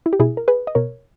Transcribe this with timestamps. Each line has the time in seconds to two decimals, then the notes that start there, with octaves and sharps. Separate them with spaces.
0.06 E4
0.13 G4
0.19 B2 E4 G#4
0.37 A#4
0.48 G#4 B4
0.67 D#5
0.75 B2 A#4 C#5